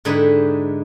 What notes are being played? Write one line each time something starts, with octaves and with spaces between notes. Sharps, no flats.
G#2 D3 D#4 E4 G4 B4